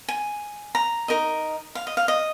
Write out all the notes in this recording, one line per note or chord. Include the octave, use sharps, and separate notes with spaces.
G#5
A#5
D#4 A#4 D#5
F5
D#5
F5
D#5